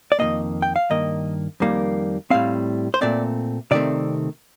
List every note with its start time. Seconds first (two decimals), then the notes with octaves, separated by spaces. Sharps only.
0.12 D5
0.19 F2 C3 D#3 A#3 D#5
0.62 G5
0.76 F5
0.90 G2 D#3 A#3 D#5
1.60 F2 D#3 G3 A#3
2.30 A2 G3 C4 F5
2.94 C5
3.01 A#2 A3 C4 D5
3.71 C3 D#3 A3 C4 D5